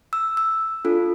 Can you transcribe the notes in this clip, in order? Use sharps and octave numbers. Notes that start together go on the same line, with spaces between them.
E6
E6
D4 F4 A4